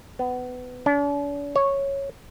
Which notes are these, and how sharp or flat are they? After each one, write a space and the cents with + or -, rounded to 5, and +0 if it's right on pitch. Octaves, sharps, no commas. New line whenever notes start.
B3 +20
D4 -45
C#5 -5